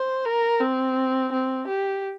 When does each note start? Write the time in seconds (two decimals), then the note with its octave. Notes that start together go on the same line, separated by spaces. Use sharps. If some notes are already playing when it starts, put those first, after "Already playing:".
Already playing: C5
0.25 A#4
0.61 C4
1.32 C4
1.67 G4